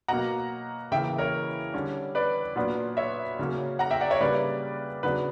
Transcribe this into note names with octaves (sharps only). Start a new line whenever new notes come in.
B2 F#3 A#3 F#5 A#5
C#3 E3 A#3 E5 G5
A#4 C#5
D3 G3 C#4
B4 D5
A#2 F#3 B3 D4
C#5 E5
C#3 F#3 A#3 C#4
F#5 A#5
E5 G5
D5 F#5
C#5 E5
C#3 G3 A#3 D4 B4 D5
C#3 F#3 B3 D4 B4